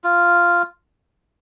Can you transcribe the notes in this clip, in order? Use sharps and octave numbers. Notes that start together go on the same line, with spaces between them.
F4